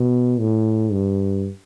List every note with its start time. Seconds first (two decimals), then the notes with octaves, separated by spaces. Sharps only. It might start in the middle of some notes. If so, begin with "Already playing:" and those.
Already playing: B2
0.40 A2
0.93 G2